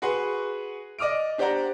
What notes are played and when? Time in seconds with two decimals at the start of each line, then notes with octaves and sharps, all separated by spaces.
0.02 F#4 G#4 B4 F#5 C6
0.99 D5 D#5 D6 D#6 F6 D7
1.38 D4 G4 C5 D5 F#5 A#5